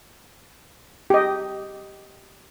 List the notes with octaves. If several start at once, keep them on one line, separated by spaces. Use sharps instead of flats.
G4 D#5